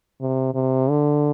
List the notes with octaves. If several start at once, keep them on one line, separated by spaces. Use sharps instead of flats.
C3
C3
D3